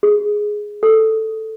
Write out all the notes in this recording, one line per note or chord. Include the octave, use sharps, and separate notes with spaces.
G#4
A4